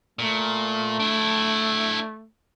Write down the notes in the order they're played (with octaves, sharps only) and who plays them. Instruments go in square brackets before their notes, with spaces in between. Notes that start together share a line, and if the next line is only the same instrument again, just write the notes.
[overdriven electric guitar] A#2 [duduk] A3
[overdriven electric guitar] D4 E4